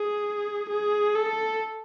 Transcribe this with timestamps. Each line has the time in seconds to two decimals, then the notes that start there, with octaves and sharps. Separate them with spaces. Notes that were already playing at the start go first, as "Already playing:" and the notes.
Already playing: G#4
0.69 G#4
1.16 A4